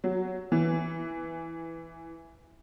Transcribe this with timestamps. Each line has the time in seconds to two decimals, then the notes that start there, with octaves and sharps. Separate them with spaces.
0.04 F#3
0.52 E3